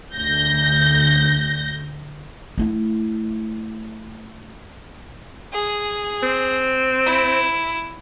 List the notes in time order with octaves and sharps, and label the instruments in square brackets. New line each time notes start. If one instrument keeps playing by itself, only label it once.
[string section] D2 G6 A#6
[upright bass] A3 E4
[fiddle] G#4
[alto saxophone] C4
[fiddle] E4